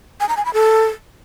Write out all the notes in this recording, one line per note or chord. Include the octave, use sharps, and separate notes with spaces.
G#5
A#5
G#5
B5
A4